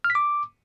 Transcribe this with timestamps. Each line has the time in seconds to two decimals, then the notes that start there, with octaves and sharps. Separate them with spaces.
0.04 F6
0.10 B6
0.15 D6